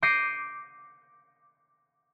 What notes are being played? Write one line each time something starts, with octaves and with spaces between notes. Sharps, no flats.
D6 G6 A#6 C7 C#7 D#7